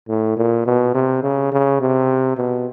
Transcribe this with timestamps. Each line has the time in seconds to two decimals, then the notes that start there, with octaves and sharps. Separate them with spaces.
0.09 A2
0.37 A#2
0.66 B2
0.94 C3
1.23 C#3
1.52 C#3
1.80 C3
2.37 B2